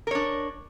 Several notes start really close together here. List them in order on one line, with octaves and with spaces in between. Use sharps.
A#4 C#5 D4